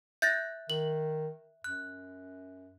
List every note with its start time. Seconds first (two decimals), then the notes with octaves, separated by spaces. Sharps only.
0.22 E5 F#6 G6 A6 A#6
0.70 D#3 F#7
1.64 F#2 F#6